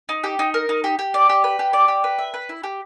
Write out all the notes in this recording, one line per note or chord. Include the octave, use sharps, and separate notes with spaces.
D#4
G4
D#4
A#4
D#4
G4
G4
D5
G4
B4
G4
D5
G4
B4
E5
B4
E4
G4